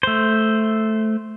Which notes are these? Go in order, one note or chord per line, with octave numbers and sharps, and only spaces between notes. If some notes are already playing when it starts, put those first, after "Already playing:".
A3 C5